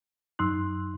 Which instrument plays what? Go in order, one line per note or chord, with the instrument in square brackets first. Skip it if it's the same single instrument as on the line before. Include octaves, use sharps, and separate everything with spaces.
[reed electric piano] F#2 C6 F#6 [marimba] D#4 E6